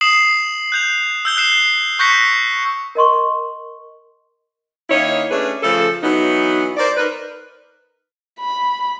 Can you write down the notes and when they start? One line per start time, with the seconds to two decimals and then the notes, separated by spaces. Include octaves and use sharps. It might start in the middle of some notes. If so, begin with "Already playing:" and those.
0.01 D#6 C7 E7 F#7
0.72 F#6 G6 F7
1.25 E6 G6 G7
1.37 F#6 C7 E7
1.99 C#6 F#6 G6 A#6 B6 C#7
2.95 A#4 D#5 C6 C#6
4.90 D#3 A#3 D#4 E4 C#5
5.30 A3 C#4 D4 G#4 B4
5.63 C#3 F3 A3 A4
6.03 E3 F#3 B3 D#4
6.77 A#4 C5 D5
6.96 D#4 A#4 B4
8.39 B5